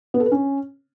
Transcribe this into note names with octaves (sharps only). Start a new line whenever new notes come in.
B3
A4
B4
C#4